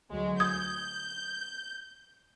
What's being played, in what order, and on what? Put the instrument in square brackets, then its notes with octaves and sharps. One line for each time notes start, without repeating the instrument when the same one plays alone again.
[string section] D2 F#3 G#3
[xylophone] D#6 G#6 [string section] G6